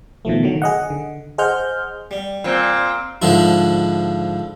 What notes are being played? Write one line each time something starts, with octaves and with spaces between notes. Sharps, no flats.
B2 D#3 F3 A3
D3 D#3 F#3
G#4 D#5 F#5
D3
G#4 C5 D#5 F#5 F6 G6
G3
A#2 C4
G#2 D3 F3 E4